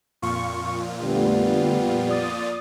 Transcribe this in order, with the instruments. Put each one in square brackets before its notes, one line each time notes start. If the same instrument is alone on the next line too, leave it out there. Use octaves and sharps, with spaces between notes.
[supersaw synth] F2 A#2 F4 [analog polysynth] C#6
[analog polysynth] D3 A3 [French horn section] G3 B3
[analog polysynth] D5 D#6 A6